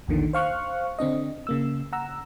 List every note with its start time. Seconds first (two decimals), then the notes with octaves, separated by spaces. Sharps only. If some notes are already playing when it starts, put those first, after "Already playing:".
0.08 A#1 E2 A#2 D3 D#3
0.33 C5 F5 C#6 F6 F#6
0.99 D3 C4 D4 D#5
1.47 C#3 A#3 E6
1.93 F#5 A#5 E6